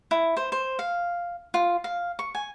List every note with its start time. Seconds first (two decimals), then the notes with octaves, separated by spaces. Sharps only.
0.11 E4
0.37 C5
0.52 C5
0.79 F5
1.54 F4
1.84 F5
2.19 C#6
2.35 G#5